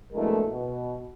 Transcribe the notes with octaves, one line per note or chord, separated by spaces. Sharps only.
A#1 B2 G#3 A3 E4 A#4
B2